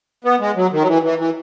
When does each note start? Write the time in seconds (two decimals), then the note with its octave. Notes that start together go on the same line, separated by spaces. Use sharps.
0.24 B3
0.40 G#3
0.56 F#3
0.72 D#3
0.82 F#3
0.87 E3
1.04 E3
1.19 E3